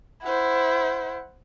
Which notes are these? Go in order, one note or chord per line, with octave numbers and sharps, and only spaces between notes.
E4 C5 F#5